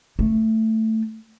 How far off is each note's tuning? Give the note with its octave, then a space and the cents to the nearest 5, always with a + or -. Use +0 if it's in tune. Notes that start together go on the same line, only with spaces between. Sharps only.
A3 +10